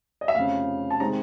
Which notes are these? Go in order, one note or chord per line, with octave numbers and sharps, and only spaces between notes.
D#5
E5
F1 F2 C#3 F5
A5
C3 D#3 G#3 C4 A#5